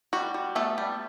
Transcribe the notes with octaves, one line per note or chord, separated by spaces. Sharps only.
G3 F#4
G3
A3 B3 A4
G3